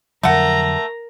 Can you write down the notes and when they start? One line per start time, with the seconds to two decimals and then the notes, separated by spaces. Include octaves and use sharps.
0.23 F2 D3 F#3 A3 A#4 F#5 A#5